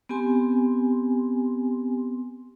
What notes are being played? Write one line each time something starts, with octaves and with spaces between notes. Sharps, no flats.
B3 C4 G4 G#5 C6